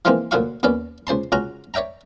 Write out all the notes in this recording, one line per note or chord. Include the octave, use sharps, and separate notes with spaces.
E3 F3 G#3 A#3 C4 D#4
D2 A#2 F#3 F#4 F5 C#6
D#2 B3 C#4 D5
C#2 C5 A5 C6
C#2 C#4 F#4 A#5
C#5 D5 E5 G5 A#5